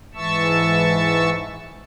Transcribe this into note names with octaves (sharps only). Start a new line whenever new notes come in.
G#2 E3 E5 A5 C#6 E6